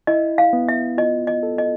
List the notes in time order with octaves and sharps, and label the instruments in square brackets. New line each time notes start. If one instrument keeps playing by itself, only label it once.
[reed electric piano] E4 [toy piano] D#5
[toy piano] F5
[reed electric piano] B3
[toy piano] E5
[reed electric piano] F4 [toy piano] D#5
[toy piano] D#5
[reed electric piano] A4
[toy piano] D#5